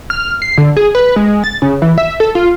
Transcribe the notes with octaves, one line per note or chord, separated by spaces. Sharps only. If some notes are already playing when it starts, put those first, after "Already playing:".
F6
C7
D3
G#4
B4
G#3
A6
C#3
E3
E5
A4
F4